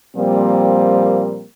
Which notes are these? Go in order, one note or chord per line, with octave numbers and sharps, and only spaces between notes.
A#2 F3 G3 A#3 C4